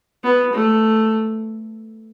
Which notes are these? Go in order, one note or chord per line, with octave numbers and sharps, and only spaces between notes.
B3
A3